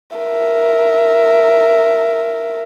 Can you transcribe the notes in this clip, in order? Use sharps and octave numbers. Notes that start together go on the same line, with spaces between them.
A#4 E5